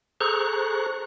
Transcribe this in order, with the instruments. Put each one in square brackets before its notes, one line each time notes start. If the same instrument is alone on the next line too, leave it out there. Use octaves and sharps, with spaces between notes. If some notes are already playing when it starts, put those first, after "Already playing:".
[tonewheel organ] G#4 A4 C5 A#5 C#6 F#6